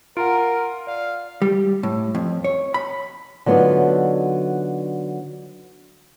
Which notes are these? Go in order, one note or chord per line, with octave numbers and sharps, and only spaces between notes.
F4 A#4 F#5 A#5 D7
D5 F5
G3
A2
F2
C#5
B5
D3 F#3 B3 D#4 F4 D5